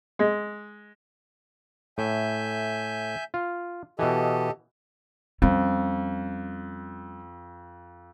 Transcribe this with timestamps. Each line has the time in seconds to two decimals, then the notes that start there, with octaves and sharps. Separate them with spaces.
0.19 G#3
1.98 A2 E5 G#5 G6
3.34 F4
3.99 B2 E3 G4 A4 D#5
5.42 F2 G3 C#4